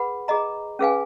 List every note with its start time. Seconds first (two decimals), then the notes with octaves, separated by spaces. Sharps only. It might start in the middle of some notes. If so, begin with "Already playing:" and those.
Already playing: G#4 B4 F#5 B5
0.28 G#4 D#5 A#5
0.79 C#4 G#4 B4 F5 G#5